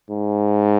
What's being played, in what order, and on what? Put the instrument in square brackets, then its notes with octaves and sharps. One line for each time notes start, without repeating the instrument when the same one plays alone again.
[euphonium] G#2